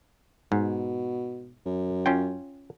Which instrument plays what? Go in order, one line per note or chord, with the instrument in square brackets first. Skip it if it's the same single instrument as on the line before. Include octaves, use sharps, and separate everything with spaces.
[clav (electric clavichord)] G#2 [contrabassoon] B2
[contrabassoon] F#2
[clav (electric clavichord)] C#4 F4 G5